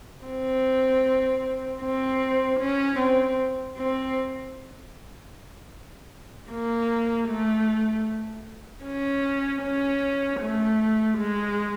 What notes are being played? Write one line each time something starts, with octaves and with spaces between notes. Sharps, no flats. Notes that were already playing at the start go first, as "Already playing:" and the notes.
C4
C4
C#4
C4
C4
A#3
A3
C#4
C#4
A3
G#3